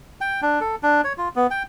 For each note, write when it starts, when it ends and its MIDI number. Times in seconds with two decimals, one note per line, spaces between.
0.21 0.41 79
0.42 0.60 62
0.61 0.76 69
0.83 1.01 62
1.04 1.13 73
1.18 1.29 65
1.36 1.47 59
1.51 1.63 79